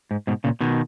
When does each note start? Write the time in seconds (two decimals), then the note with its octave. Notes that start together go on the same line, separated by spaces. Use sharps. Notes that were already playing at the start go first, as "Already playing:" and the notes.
0.11 G#2
0.27 G#2 B2
0.44 A#2 C#3
0.61 B2 D#3